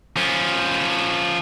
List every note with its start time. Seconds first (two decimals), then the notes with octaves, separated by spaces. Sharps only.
0.16 F3 C#4